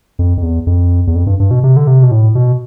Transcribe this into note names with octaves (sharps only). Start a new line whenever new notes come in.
F2
F2
E2
F2
E2
F2
G2
G2
B2
C3
D3
C3
B2
A2
B2